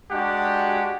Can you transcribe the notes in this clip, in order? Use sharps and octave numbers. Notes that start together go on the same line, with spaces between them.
G#3 D4 F#4 G4 F#5